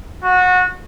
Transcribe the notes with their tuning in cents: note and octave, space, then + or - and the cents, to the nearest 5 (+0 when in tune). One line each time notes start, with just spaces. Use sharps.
F#4 -20